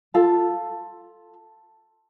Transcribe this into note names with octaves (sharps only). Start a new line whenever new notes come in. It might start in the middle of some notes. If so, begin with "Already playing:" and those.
F4 A4 A5